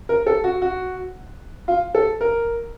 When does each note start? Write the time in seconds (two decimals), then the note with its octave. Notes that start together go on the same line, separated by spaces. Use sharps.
0.09 A#4
0.27 A4
0.44 F#4
0.62 F#4
1.68 F4
1.95 A4
2.21 A#4